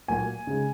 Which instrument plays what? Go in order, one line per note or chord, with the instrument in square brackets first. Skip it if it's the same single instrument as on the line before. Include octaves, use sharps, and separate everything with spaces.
[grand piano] A#2 F#3 A#3 G#5
C#3 G#3